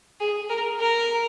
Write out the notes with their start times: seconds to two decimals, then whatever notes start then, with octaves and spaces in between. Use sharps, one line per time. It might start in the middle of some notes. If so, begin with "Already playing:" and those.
0.20 G#4
0.50 A#4
0.80 A#4